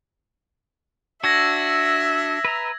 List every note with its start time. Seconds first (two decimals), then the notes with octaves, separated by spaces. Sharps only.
1.24 D4 F#4 E5 E6 G#6 A#6
2.45 B4 A#5